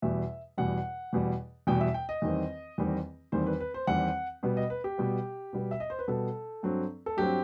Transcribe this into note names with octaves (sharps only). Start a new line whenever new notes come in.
E2 B2 G3 E5
E2 B2 G3 F#5
E2 B2 G3
E2 B2 G3 G5
E5
G5
D#5
E2 D#3 G3 C4
E2 D#3 G3 C4
E2 D#3 G3 C4 C5
B4
B4
C5
E2 D#3 G3 C4 F#5
B2 G3 B3
D#5
B4
G4
B2 G3 B3
B2 G3 B3
E5
D#5
C5
B4
B2 G3 B3 A4
G2 F#3 C4
A4
G2 F#3 C4 G4